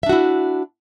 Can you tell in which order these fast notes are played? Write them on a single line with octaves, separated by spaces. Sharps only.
E5 D4 F#4 E4